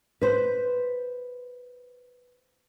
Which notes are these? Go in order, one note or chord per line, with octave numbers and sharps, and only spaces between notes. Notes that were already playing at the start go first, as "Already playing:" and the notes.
B4 C5